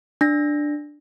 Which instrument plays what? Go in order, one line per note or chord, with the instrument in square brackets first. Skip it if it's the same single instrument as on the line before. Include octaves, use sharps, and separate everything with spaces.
[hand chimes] D4 A#6